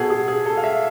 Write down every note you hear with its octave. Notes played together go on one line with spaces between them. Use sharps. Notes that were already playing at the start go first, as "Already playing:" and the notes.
Already playing: B2 B3 G#4 A4
G#4
G#4
A4
F5
E5